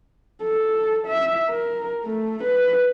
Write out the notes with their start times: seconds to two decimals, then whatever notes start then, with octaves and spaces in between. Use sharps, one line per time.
0.43 A4
1.07 E5
1.49 A#4
2.05 A3
2.43 B4